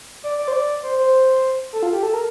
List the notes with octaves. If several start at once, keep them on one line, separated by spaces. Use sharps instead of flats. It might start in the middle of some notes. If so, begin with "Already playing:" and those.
D5
D5
C5
D5
C5
C5
A4
F4
G4
A4
A#4